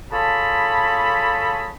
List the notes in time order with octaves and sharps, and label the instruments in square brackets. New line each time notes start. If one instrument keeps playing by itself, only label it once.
[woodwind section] F4 G#4 A4 C#5 A5 B5